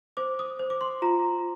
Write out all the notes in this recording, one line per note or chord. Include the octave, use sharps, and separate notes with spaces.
C5 D6
D#6
C5
D6
C6
F4 A#5